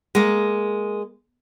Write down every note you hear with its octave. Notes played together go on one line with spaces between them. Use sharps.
G#3 A#3